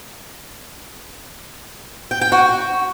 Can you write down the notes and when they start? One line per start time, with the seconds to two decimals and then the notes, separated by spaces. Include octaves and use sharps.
2.11 G5
2.21 G5
2.32 F#4